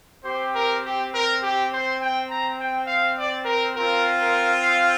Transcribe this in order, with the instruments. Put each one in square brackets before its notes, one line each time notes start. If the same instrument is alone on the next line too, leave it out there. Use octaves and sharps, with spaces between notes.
[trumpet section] C4 G4 C5
A#4
G4
A#4
G4
C5
G5
A#5
G5
F5
D5
A#4
C4 F4 A#4
A#4
F5